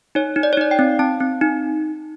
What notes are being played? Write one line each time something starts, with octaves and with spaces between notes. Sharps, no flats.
D#4 C#5
D#4
D5
C#5
D#4 D5
G5
C4
C4 A5
C4
D#4